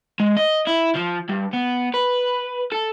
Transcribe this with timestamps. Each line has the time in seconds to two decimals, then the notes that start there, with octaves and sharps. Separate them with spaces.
0.20 G#3
0.37 D#5
0.67 E4
0.95 F3
1.29 G2
1.53 B3
1.94 B4
2.72 A4